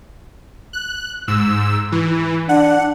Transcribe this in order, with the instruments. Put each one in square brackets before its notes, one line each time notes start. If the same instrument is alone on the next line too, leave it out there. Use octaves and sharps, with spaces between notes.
[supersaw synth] F#6
G#2 E6
E3
[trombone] D4 [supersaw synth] F#5